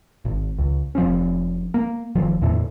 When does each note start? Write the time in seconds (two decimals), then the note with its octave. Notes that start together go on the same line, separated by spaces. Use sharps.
0.25 G#1
0.58 C#2
0.95 F1 F3 C4 C#4
1.74 A#3
2.15 F#1 D#3 F3
2.41 E2 A2 D3